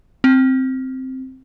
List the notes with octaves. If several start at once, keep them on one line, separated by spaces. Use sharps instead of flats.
C4